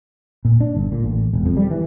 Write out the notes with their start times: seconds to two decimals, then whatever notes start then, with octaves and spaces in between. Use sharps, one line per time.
0.45 A#2
0.60 D4
0.75 G1
0.92 A#2
1.04 A1
1.33 E1
1.46 F2
1.57 G3
1.71 E3